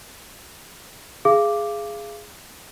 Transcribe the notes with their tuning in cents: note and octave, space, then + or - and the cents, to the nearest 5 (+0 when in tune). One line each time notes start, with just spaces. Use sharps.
G#4 +0 F5 -30 D6 +0